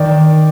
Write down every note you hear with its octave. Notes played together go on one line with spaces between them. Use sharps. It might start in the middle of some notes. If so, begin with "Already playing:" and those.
Already playing: D#3 D5